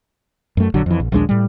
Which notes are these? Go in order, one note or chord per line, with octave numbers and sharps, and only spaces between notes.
F#2 A3
A#1 D3 F#3
F2 E3
A#1
A#1 D#2 G#3 D4
A2 G3